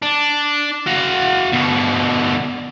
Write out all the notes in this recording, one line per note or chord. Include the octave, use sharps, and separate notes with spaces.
D4
F#4 F5
B2 D3